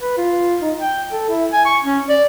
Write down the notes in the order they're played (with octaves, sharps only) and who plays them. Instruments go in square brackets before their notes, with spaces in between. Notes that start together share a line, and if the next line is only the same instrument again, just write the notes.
[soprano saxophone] B4
F4
D#4
G5
A4
E4
G#5
C#6
C#4
D5